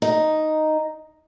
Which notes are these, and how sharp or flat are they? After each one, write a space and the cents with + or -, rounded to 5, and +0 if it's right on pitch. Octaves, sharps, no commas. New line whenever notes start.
D#4 +0